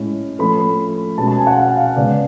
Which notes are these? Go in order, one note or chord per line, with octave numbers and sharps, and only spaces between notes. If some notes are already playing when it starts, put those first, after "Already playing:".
Already playing: A2 G#3 C#4
F3 A3 C#4 B5
B2 G#3 C#4 A5
A5
G#5
F#5
F5
F5
C#3 G#3 B3 D5